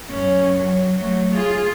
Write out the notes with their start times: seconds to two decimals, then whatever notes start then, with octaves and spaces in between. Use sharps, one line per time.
0.10 F#2 C#4
0.56 F#3
0.98 F#3 A3
1.33 F4 G#4